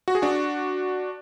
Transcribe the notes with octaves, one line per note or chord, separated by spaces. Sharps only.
F#4
G#4
D4 F#4